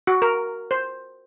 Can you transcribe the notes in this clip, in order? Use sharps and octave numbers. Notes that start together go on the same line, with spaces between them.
F#4
A#4
C5